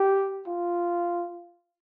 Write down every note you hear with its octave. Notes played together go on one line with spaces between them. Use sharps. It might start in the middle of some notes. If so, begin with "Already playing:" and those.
Already playing: G4
F4